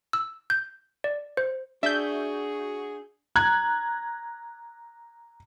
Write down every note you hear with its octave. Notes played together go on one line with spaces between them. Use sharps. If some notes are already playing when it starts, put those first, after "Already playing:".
E6
G6
D5
C5
D4 F#4 G#4 E5 G6
A#5 F#6 G#6